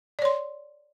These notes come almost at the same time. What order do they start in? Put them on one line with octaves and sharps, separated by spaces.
D5 C#5 C6